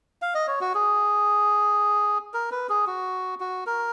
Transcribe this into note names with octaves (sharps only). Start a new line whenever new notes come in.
F5
D#5
C#5
F#4
G#4
A#4
B4
G#4
F#4
F#4
A#4